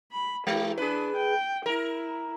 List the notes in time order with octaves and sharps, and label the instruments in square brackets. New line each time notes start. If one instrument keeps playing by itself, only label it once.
[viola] B5
[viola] E3 G4 [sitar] G#3
[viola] D4 [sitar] G#4 B4
[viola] G5
[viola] E4 [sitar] A#4